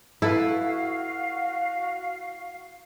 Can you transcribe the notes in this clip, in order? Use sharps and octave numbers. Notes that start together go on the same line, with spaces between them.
E4 F#4 A4 B4 F5